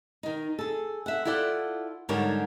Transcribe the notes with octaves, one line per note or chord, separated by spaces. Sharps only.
D#3 D#4
G#4 A4
E5 F#5
E4 F4 A4 D5 F#5
G#2 D3 G3 D4 A#4 C#5